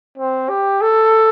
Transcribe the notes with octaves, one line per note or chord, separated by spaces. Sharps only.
C4
G4
A4